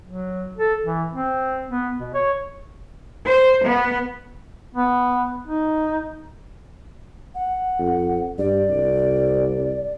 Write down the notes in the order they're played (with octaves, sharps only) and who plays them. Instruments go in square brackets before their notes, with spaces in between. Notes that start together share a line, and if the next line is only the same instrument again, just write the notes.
[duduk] F#3
A4
E3
C4
B3
B2
C#5
[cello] C5
B3
[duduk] B3
D#4
[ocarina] F#5
[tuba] F2
[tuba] G2 [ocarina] D5
[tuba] C2